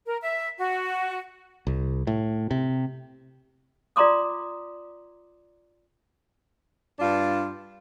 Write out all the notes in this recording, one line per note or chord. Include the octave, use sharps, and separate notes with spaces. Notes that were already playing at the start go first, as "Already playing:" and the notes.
A#4
E5
F#4
C2
A2
C3
F4 D5 A#5 C6 D6 D#6
G2 D4 F4